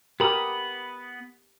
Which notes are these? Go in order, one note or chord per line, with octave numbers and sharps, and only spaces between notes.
B3 G4 A#4 B5 D#6